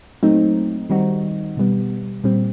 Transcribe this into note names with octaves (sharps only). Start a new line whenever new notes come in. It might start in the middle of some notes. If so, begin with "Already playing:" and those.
A#2 F#3 A3 C4 D#4
D#3 G3 C4 D#4 F#4
B2 G3 B3
A#2 G3 C4